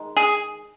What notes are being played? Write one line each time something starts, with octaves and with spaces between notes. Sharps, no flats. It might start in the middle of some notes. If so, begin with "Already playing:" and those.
Already playing: D#3 G#3
G#4